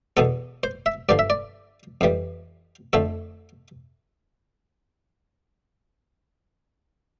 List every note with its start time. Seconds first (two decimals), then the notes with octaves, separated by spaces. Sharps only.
0.17 E2 B2 B3 A4
0.63 C5
0.86 E5
1.09 G2 D3 F3 D5
1.19 E5
1.30 D5
2.01 F2 E3 G3
2.93 F2 D3 A3 A4